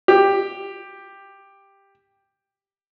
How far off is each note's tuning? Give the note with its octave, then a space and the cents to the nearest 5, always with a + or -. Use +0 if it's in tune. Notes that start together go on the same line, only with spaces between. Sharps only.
G4 +10